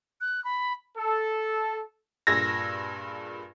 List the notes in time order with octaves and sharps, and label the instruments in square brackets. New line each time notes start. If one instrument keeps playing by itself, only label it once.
[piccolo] F#6
B5
[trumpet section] A4
[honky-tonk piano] G2 A#2 G#4 E6 G#6 A#6